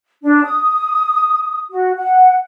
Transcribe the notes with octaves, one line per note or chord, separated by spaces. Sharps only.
D4
D#6
F#4
F#5